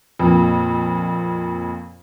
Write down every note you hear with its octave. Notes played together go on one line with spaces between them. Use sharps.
F2 A#2